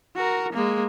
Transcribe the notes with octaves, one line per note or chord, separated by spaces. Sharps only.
F#4 A#4
G#3 A#3